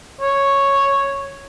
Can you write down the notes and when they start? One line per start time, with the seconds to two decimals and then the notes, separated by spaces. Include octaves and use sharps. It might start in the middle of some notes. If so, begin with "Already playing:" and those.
0.21 C#5